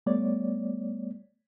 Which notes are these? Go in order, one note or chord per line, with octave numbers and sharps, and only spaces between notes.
G3 A3 B3 C#5 D5